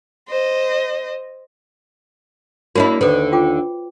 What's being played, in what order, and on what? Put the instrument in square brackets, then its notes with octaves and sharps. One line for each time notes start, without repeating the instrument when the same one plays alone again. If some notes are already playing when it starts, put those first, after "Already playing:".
[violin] C5 D#5
[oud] A#3 D4 E4 [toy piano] F#4 C#5 D#5
[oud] D#2 D3 [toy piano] A4 B4 C5
[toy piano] F4 G5 D6